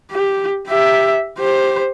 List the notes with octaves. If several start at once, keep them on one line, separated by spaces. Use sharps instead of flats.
G4
G4 E5
G4 C5